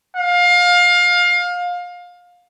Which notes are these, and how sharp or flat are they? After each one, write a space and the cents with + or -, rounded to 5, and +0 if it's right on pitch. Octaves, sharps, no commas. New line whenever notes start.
F5 +25